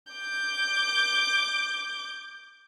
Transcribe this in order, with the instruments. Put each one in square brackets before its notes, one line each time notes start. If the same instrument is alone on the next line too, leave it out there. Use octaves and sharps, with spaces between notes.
[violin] D6 G6